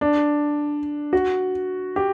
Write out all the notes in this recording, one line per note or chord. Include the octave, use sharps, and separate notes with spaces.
D4
F#4
G4